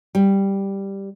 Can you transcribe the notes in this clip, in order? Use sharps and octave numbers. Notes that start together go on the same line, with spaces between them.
G3